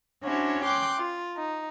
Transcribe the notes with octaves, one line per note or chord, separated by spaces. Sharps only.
C#4 D4 E4 F#4 C5 C#5
G5 C6 D6 F#6 G6
F4
D#4